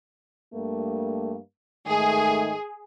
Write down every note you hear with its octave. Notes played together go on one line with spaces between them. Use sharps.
G2 A3 A#3
G#2 D#3 A3 G#4